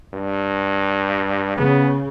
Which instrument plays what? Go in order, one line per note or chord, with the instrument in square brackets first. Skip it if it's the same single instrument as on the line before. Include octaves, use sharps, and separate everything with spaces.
[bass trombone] G2
[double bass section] C#3 [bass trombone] B3